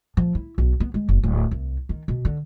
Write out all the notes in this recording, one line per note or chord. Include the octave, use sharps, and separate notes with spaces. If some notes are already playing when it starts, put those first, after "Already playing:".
F3
E4
B1
B3
G#3
F#1
D1
C2
D#3
B2
D3